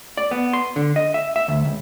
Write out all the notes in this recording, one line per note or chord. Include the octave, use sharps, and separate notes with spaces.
D5
B3
C6
D3
D#5
E5
E5
D2
C#2